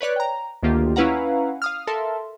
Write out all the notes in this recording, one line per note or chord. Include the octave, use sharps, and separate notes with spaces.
B4 C#5 D5 F#6
G5 A#5
D2 D#3 A#3 F4 G4
C#4 E4 B4 F5 F#5 A#5
F5 D#6 F6
A4 A#4 E5 A5 C6